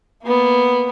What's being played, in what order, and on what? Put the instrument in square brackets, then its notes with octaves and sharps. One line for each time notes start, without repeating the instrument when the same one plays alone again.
[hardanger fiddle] A#3 B3